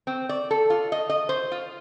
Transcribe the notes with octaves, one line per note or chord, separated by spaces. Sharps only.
C4
D5
A4
F4
D#5
D#5
C5
F4